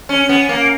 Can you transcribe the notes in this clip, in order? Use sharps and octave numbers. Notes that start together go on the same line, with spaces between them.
C#4
B3
A#3